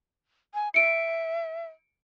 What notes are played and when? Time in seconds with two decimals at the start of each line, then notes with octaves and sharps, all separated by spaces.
0.54 G#5
0.74 E5 C#7 D7